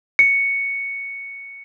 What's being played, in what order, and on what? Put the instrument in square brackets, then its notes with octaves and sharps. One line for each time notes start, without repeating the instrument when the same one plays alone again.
[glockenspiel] C#7